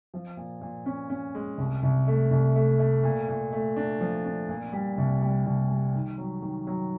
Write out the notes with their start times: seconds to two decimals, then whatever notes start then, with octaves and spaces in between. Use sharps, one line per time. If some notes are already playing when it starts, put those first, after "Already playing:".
0.14 F3
0.37 A#2
0.61 A#2
0.86 C#4
1.10 C#4
1.35 G#3
1.58 C2
1.83 C2
2.07 A3
2.31 C2
2.55 A3
2.79 A3
3.03 A#2
3.28 A#2
3.53 A3
3.76 D4
4.01 F3
4.25 D4
4.49 A#2
4.73 G3
4.98 C2
5.22 G3
5.46 C2
5.70 G3
5.95 D#3
6.18 F#3
6.42 D#3
6.67 F#3